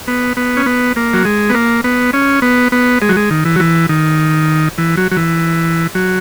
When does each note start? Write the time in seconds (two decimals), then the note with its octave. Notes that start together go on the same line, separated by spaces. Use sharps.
0.08 B3
0.37 B3
0.57 C#4
0.66 B3
0.96 A#3
1.14 F#3
1.25 G#3
1.50 B3
1.54 A#3
1.84 B3
2.13 C#4
2.42 B3
2.72 B3
3.02 G#3
3.09 F#3
3.16 G#3
3.31 D#3
3.45 E3
3.56 F#3
3.60 E3
3.89 D#3
4.78 E3
4.97 F#3
5.12 F#3
5.17 E3
5.95 F#3